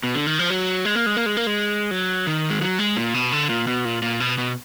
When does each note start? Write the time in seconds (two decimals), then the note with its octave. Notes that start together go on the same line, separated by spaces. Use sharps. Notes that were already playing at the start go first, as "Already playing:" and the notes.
0.04 B2
0.15 D3
0.27 D#3
0.39 F3
0.50 F#3
0.85 G#3
0.95 A#3
1.06 G#3
1.17 A#3
1.26 G#3
1.37 A#3
1.47 G#3
1.91 F#3
2.27 D#3
2.50 G#3
2.61 F#3
2.79 G#3
2.97 A#2
3.14 B2
3.32 D3
3.49 A#2
3.67 B2
3.85 A#2
4.02 A#2
4.20 B2
4.38 B2